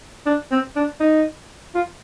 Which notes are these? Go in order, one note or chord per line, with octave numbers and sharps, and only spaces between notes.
D4
C4
D4
D#4
F4